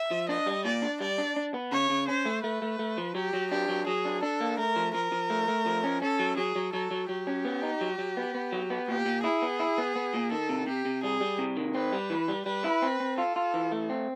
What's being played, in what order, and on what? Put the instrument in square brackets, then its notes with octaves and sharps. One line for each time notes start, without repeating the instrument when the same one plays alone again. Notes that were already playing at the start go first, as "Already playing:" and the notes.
Already playing: [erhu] E5
[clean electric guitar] F3
[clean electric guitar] D4 [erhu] D#5
[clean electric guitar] G3
[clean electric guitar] A#2 [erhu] D5
[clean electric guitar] D4
[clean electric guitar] G3 [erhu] D5
[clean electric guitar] D4
D4
B3
[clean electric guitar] C#3 [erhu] C#5
[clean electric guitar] C#3
[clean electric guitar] C#4 [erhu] C5
[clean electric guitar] A3
[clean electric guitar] A3 [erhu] B4
[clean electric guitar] A3
A3
F3
[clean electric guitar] F#3 [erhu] G4
[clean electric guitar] F#3
[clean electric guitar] D4 [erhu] G4
[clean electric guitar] F#3
[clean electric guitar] F#3 [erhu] G#4
[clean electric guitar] D4
[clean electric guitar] D4 [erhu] A4
[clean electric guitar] A#3
[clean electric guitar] A3 [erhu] A#4
[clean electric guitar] F3
[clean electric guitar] F3 [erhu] A#4
[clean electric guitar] F3
A3
A3
F3
C#4
[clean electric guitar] C#4 [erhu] A4
[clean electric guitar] F#3
[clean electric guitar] F#3 [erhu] G#4
[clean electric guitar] F#3
[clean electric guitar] F#3 [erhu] A4
[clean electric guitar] F#3
[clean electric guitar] F#3 [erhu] G4
[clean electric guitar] C#4
B3
D#4
F#3
F#3
B3
B3
F#3
B3
[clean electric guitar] A#2 [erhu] G4
[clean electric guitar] A#2
[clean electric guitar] E4 [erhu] G#4
[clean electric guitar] B3
E4
B3
B3
A#2
[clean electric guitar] D#3 [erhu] A4
[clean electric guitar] C3
[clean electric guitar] C3 [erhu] G4
[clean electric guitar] C3
[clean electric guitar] G3 [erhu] G#4
[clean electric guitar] G3
C3
D#3
[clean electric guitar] C4 [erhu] B4
[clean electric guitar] G3
E3
G3
[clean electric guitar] G3 [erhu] B4
[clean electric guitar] E4
C4
C4
[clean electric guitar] F4 [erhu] A4
[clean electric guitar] F4
E3
A3
C4